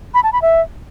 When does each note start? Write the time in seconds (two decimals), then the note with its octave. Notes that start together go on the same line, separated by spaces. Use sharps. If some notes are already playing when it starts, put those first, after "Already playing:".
0.14 B5
0.23 A5
0.33 B5
0.42 E5